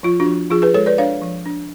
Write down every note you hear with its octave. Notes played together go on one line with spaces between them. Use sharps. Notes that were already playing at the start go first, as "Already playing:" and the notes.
F3 F4
D4 F#4
F3
F3 F4 G#4
G#4 B4
G#3 A4 C#5
B4 D5
D4 C#5 F5
F3
D4